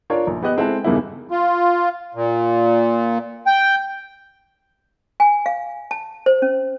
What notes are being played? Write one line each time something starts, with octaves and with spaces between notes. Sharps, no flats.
D4 F4 A#4 C#5 D5
A#1
B3 G4 D#5 F#6
G#3 C4 E4 A4
E2 G2 C#3 A#3 D#4 E4
F4
A#2
G5
G#5
F5
A5
C5
C#4